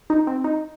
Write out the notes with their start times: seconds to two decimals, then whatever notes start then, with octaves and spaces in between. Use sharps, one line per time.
0.10 D#4
0.27 C4
0.44 D#4